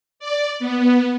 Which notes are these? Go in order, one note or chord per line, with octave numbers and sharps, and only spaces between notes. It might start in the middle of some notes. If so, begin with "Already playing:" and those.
D5
B3